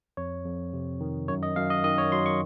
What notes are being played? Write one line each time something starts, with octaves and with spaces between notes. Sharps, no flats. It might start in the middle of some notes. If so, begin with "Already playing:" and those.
F2 C#5
F2
C3
D#3
F#2 C#5
D#5
F#2 F5
D#5
D#3 D#5
C#5
F#3 C6
C#6